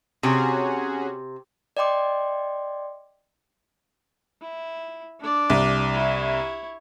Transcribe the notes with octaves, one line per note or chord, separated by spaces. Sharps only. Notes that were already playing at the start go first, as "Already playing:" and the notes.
C3 C#4 F#4 G#4
D5 D#5 G5 C6 D6
E4
D4 D5
C2
E4 C#5